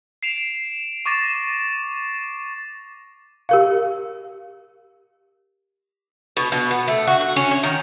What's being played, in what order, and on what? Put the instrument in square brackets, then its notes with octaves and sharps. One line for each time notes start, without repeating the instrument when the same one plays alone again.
[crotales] C7 D7 E7 F7
C#6 D6 A6 A#6 E7
[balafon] G4 A#4 F5
[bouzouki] B2
B2
B3
A3
F#4
F#4
C#4
C#5
D#3